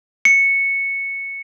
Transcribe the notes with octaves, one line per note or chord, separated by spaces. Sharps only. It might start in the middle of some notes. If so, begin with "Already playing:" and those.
C#7